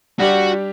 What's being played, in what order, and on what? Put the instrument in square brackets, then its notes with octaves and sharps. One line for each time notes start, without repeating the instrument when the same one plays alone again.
[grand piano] G3 D4 G4 [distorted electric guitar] F#4